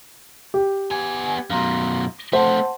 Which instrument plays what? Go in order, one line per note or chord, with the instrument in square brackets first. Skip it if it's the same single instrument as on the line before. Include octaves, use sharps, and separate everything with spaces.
[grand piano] G4
[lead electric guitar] B3 G#5 [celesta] G#6
[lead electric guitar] F#2 B2 [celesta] F5 A#5 C6
[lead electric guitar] A3 C4 [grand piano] C5 [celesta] F#5 A5 C6